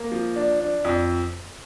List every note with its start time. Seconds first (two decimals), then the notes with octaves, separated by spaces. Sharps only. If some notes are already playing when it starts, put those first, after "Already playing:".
Already playing: A#3
0.12 F3
0.36 D4
0.60 D4
0.84 F2